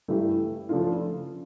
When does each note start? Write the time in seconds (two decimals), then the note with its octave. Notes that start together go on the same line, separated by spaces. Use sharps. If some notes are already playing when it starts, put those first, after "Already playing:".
0.08 G2 E3 A3 E4 G4
0.69 C#3 F3 A3 D4 F4